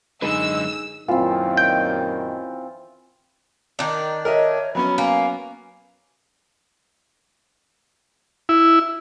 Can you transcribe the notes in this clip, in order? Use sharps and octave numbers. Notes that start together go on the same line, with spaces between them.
F#2 D3 G#3 D#4 G#4 B4 E6
F#2 A#2 D#3 E3 C4 F4
G5
D#3 D4
A#4 C#5 D#5 E5
F#3 B3 C#4 B5
A#3 G#5
E4